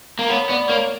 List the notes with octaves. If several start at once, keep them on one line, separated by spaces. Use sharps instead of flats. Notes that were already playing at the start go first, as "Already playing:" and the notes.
A#3
B3 C#5
B3 D5
A#3 C#5